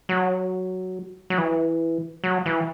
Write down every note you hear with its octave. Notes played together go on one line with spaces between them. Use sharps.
F#3
F#3
E3
F#3
E3